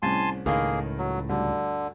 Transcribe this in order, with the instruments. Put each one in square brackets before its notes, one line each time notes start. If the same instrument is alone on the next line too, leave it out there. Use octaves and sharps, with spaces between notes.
[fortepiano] C2 A2 C#4 [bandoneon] G#5 A5 C6
[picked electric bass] C#2 A2 [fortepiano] D#3 F5 [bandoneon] A#3 G#4
[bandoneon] F#3
[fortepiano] D2 G2 [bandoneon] D3